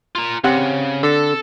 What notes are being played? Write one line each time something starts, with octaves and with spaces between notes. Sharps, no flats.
F4 A#5
C#3 C4 G4 F#5
D3 A4